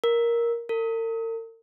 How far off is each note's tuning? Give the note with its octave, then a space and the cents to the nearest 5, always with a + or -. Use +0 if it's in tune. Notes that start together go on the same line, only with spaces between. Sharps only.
A#4 +5
A#4 -45